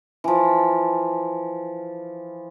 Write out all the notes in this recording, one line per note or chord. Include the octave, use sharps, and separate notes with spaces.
E3 F3